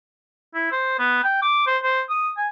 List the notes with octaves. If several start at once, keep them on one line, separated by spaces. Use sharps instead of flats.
E4
C5
B3
G5
D6
C5
C5
D#6
G#5